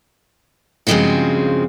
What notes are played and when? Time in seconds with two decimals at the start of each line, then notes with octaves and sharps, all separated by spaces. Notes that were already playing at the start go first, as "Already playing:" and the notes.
0.87 G2 C#3 F3 G#3 C4 F#4